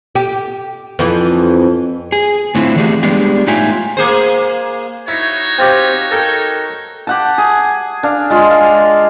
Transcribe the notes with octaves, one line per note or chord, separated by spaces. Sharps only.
G4
F2 E3
G#4
A2 D3 C4 E4 F4
D3 E3 A3 D4 G4 G#4
G3 G#3 B3 D4 G4
A2 D#4 F4 E5 G5 G#5
A#3 G#4 C5
D#4 E4 F#4 C#5
C4 F4 G4
A4 A#4 G5
G4 F#5 A5
G#4
D4 F5
G#3 F4
F5